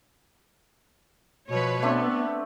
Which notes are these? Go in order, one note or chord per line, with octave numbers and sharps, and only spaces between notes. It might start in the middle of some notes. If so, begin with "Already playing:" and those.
B2 F3 B4 C#5
A3 B3 C4 D4